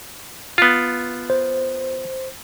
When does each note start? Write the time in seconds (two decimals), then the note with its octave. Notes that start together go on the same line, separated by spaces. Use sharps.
0.58 B3 F4
1.30 C5